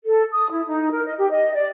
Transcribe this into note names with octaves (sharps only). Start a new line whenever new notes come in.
A4
D#6
E4
D#4
A#4
D#5
G4
D#5
D5